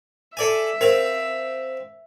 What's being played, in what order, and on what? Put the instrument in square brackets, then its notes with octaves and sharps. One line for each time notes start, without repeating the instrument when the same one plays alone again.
[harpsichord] A4 D5 G#5 [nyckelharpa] E5
[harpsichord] C4 F5 [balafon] A#4